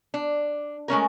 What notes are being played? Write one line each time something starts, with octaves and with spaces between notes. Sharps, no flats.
D4
G#3 A3 C#4 A#4